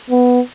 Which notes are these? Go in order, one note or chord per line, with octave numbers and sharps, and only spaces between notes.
B3